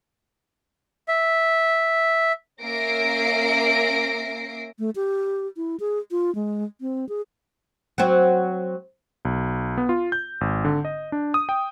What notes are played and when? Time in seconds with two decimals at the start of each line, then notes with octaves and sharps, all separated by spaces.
1.08 E5
2.63 A#3 C#4 E5 A#6 C7 D7
4.79 A3
4.95 G4
5.57 E4
5.80 G#4
6.11 F4
6.35 G#3
6.81 C4
7.09 G#4
7.98 F#3 C4
9.25 B1
9.77 B3
9.89 F4
10.12 G6
10.41 G#1
10.65 D3
10.85 D#5
11.12 D4
11.34 D#6
11.49 G5